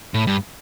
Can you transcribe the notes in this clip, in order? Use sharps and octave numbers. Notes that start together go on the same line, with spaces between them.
A2
G2